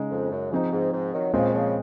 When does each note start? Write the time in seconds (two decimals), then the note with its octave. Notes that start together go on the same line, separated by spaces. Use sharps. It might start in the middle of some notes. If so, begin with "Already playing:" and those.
Already playing: C#3 G#3 D#4
0.10 F2
0.31 F#2
0.51 G#2 F3 C4 D#4
0.72 G#2
0.92 G#2
1.13 D#3 F#3
1.33 A#2 C#3 F3 G#3 C4
1.54 C#3 F3